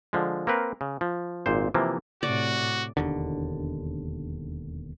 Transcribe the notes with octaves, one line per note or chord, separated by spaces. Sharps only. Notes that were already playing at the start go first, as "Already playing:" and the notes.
D3 F3 G#3
A#3 C4 A#4 B4
C#3
F3
G#1 A#2 C5
C3 E3 F3 A#3
A2 C3 F#4 D5
E1 D#2 D3